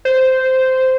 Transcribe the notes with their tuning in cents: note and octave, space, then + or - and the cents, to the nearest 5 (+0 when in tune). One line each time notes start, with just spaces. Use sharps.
C5 -10